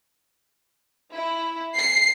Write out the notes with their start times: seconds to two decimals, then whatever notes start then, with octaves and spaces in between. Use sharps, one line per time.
1.14 E4
1.74 C7